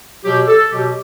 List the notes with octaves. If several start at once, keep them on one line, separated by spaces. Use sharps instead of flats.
B2 F#3 G4
A4
B2 F#3 G4